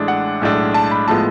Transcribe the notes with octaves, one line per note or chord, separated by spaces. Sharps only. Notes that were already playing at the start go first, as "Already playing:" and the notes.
Already playing: A1 A2 G#3 D4
F#5
B1 A2 G#3 D4
A5
B5
A2 F3 G#3 B3 A5